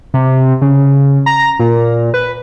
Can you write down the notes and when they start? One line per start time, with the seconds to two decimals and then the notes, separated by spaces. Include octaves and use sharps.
0.14 C3
0.62 C#3
1.26 A#5
1.60 A#2
2.14 B4